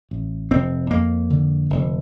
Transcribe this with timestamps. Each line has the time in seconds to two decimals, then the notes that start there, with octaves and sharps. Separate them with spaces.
0.11 A1
0.51 F1 C4
0.90 F2 A#3
1.30 D3
1.70 F1